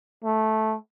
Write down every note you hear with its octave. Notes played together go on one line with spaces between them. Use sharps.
A3